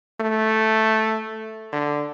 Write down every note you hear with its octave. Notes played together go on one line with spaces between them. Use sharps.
A3
D3